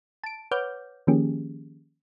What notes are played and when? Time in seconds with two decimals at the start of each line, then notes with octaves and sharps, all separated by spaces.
0.24 A5 D7
0.51 B4 C#5 F#5 D6 F6 G6
1.07 D#3 F3 A#3 C#4 G4 G#4